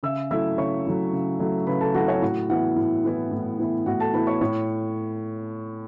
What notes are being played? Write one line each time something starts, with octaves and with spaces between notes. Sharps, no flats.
C#3 E5 E6
F#3 A3 E4 E5 E6
C#3 C#5 C#6
F#3 A3 E4
C#3
F#3 A3 E4
C#3 B4 B5
A4 A5
F#3 A3 E4 F#4 F#5
C#4 C#5
A2 F#4 F#5
E3 B3 E4 F#4 F#5
A2
E3 B3 E4
A2
E3 B3 E4
A2 F#4 F#5
A4 A5
E3 B3 E4 B4 B5
C#5 C#6
A2 C#5 C#6